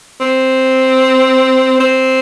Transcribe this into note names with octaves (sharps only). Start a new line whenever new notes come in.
C4
C4